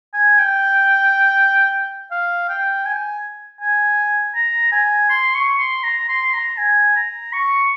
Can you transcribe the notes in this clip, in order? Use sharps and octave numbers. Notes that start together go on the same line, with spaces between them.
G#5
G5
F5
G5
G#5
G#5
A#5
G#5
C6
C#6
C6
A#5
C6
A#5
G#5
A#5
C#6